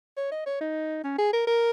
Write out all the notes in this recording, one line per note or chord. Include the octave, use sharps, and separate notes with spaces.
C#5
D#5
C#5
D#4
C#4
G#4
A#4
A#4